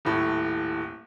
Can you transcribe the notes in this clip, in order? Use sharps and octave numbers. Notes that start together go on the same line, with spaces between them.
D#1 A2